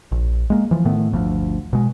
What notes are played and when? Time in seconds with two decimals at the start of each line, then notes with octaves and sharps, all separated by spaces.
0.12 A#1
0.50 G#3 A#3
0.71 E3 F3
0.85 A2 D#3 A3 B3
1.12 G1 D2 F3
1.73 B2 G#3